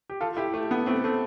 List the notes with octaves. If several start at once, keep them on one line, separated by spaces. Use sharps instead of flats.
G4
F4 A4
E4 G4
A3
B3
A3 C4
A3 C4